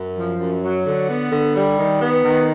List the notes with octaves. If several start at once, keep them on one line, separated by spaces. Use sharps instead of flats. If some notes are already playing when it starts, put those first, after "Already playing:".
Already playing: F#2
F3
F#2
F#3
D3
B3
D3
G3
D#3
B3
D#3